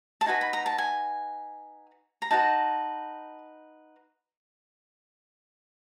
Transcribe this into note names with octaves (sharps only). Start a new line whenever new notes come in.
A5
D#4 F#4 B4 G#5
B5
A#5
A5
G#5
A#5
D#4 F#4 B4 A5